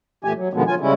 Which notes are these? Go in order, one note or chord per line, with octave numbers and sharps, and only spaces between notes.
E2 A#2 E3 A3 G4 G#5
F#3
B2 D3 D#3 F3 G#3 B3
F2 F#3 F4 G#5
C#3 G3 G#3 C#4 E4